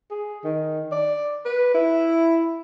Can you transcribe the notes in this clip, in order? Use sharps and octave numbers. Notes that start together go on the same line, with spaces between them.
G#4
D#3
D5
B4
E4